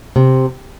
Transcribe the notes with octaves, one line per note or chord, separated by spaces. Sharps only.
C3